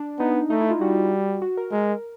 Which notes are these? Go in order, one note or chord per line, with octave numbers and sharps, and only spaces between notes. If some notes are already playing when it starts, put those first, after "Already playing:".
Already playing: D4
B3 D#4
A3 D#4
E4
F4
G3 F#4
F#4
A#4
G#3 A#4